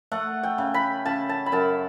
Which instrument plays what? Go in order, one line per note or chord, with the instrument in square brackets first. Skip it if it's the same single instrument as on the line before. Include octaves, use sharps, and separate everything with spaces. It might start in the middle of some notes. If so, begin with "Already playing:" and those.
[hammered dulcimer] A3 F#5
G5
C#3
B5
C#3 A5
A5
B5
F#2 A5